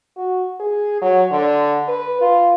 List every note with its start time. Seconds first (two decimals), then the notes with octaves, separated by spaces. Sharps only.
0.17 F#4
0.60 G#4
1.01 F#3
1.32 D3
1.88 B4
2.21 F4